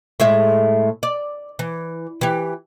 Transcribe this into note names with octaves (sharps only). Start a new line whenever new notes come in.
A2 G#3 E5
D5
E3
E3 G4